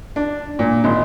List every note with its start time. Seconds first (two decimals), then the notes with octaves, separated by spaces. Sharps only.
0.16 D4
0.59 A#2
0.84 G#1